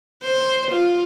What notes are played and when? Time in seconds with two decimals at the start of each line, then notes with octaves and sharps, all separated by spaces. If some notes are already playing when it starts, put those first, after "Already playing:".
0.24 C5
0.71 F4